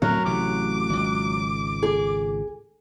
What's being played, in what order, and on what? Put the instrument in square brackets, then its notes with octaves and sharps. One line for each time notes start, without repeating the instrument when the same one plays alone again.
[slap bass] D2 A2 C4 [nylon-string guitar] F#3 [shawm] A#4
[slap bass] A1 C3 A3 [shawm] D6
[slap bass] G#1 C#2
[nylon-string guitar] G#4